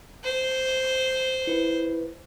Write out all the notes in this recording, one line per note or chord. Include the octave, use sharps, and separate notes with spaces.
C5
E4 B4